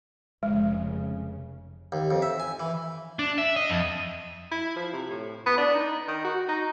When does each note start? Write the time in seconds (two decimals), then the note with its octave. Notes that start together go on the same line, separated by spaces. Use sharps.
0.43 F1 C#3 G#3
1.92 D#2
2.11 F2
2.22 E5
2.40 G#5
2.60 E3
3.19 D4
3.38 E5
3.56 D#5
3.70 F2
4.52 E4
4.76 F3
4.93 C3
5.10 A2
5.46 B3
5.58 D4
5.75 D#4
6.08 D#3
6.24 F#4
6.48 D#4